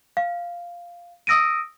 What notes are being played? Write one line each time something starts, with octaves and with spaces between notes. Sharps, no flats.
F5
D#6 E6 A#6 D7 D#7